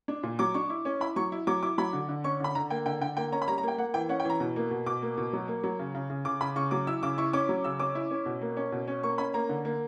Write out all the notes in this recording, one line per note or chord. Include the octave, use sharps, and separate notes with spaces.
D4
A#2
F#3 D6
D4 C#6
E4
C#4
E4 B5
F#3 C#6
E4
F#3 D6
E4 D6
F#3 B5
D3
D3
C#4 C#6
D3 B5
D3 A#5
A#3 G5
D3 G5
D3 G5
A#3 G5
C#4 A#5
B5
G3 A#5
A#5
A#3 G5
A#3 F#5
E3 G5
C#4 F#5
G5
E3
A#5
B2
A#3
B2
B2 D6
A#3
B2
F#3
A#3
F#3
C#3
C#3
C#3
C#3 D6
C#3 B5
C#3 C#6
F#3 D6
E4 E6
C#3 D6
E4 C#6
C#4 D6
F#3
C#3 E6
C#4 D6
E4
C#4
B2
A#3
C#4
B2
C#4
A#3 C#6
C#4 B5
A#3 A#5
D3
A#3